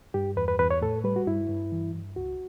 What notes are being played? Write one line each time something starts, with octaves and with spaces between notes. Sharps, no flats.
G2 G4
E2 B4
B4
E2 B4
C#5
A2 A4
G3 B4
F#4
G2 E4
G2
E3
G2
C#2 F#4